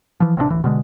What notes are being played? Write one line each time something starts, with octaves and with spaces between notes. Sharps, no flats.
E3 F3
A1 C3 F3 D4
D1 A1 E3
B2 D3 G#3